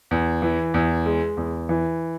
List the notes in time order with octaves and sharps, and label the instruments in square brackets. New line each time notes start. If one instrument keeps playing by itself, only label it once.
[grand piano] E2
E3
E2
G#3
E2
E3